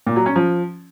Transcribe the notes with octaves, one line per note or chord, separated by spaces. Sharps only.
A#2
F#3
C#4
F3